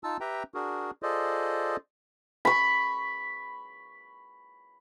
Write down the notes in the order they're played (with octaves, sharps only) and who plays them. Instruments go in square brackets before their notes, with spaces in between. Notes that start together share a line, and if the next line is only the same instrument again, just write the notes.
[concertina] D#4 F4 A5 E6
G4 B4 E5 G5 A#5
D4 F#4 G#4 A#4
F4 G#4 A4 C5 D5 D#5
[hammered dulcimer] B5 C#6